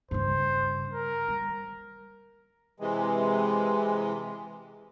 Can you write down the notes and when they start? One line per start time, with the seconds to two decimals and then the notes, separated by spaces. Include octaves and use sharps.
0.11 G2 C#3 C5
0.93 A#4
1.28 G3
2.80 C3 E3 G#3